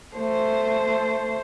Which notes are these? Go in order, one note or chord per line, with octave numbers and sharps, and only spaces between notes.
A3 C5